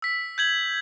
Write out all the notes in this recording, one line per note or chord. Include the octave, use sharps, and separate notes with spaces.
E6 B6
G6 G#6 F#7